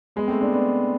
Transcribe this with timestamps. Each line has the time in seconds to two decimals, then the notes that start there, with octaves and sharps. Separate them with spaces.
0.16 G#3 B3
0.28 A3 C4
0.41 B3 D4
0.53 B3 D4